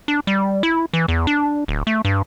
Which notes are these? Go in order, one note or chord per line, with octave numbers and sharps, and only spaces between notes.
D4
G3
E4
E3
E2
D4
D1
A3
G2